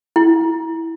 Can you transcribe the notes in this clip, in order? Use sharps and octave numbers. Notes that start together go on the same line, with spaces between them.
E4